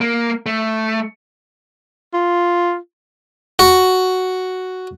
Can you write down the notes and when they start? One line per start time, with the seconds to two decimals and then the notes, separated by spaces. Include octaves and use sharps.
0.01 A#3
0.46 A3
2.13 F4
3.59 F#4